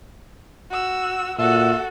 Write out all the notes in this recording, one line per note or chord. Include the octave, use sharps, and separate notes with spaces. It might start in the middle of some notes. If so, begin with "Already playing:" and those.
F#4 E6
A#2 F#4 A4 E5